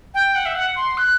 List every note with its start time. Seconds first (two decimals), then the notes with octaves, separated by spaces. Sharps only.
0.14 G5
0.35 F#5
0.45 E5
0.55 F#5
0.76 C6
0.97 F#6